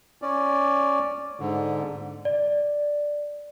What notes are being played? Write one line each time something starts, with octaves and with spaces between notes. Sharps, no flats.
C#4 D5
G#2 D3
D5